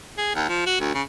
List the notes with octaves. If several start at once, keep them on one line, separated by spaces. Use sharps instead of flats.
G#4
D#2
F3
F#4
D2
C#3